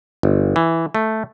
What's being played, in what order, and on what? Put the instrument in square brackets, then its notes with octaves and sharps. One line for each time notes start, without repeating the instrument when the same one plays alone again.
[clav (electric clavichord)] G1
E3
A3